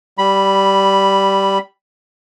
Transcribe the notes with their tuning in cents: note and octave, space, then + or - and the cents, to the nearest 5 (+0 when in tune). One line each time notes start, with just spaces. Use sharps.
G3 -10 B5 -5